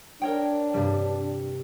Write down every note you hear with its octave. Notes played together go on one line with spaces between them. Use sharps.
D4 A#4 C#5 G5
G2 C3 G3